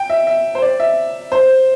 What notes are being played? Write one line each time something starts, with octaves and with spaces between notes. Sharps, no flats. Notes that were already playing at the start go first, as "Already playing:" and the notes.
Already playing: G5
E5
E5
C5
D5
E5
C5